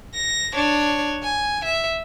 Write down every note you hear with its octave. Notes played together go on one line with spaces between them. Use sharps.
A#6
D4 C#5
G#5
E5